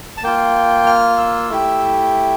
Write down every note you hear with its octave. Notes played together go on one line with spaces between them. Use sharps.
A5
A#3 F4 G5
F6
E6
A3 E4 G4